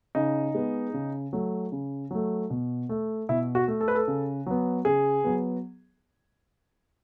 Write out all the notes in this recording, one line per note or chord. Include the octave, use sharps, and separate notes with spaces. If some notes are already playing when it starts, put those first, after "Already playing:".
C#3 D#4
G#3 B3
C#3
F#3 A3
C#3
F#3 A3
B2
A3
B2 E4
F#4
A3
A4
B4
A4
C#3
F#3 B3
C#3 G#4
F#3 B3